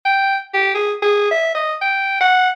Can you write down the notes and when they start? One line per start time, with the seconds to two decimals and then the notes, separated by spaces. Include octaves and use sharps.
0.05 G5
0.54 G4
0.74 G#4
1.02 G#4
1.31 E5
1.55 D#5
1.82 G5
2.20 F#5